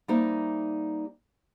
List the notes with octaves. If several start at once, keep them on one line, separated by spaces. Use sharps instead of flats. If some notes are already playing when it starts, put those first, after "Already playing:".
G3 A#3 D#4 G4 C5 E5